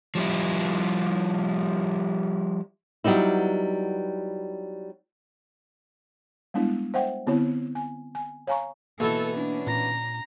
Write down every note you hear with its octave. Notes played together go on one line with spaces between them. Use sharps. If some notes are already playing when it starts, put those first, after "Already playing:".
F3 G3 E4
F#3 G3 B3 D#4 E4
G3 G#3 B3 D4 E4
C5 E5 F#5 G5
D3 B3 C4 E4 C#5
G#5
G#5
C#5 F5 G#5 A#5 C#6
B2 E3 A#3 A4
C#4 D4
A#2 A#5